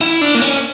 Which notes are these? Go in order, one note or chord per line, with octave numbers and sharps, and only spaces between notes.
E4
D4
A#3
C#4